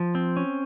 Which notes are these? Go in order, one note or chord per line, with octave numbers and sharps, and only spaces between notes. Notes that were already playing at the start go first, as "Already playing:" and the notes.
Already playing: F3
C4
C#4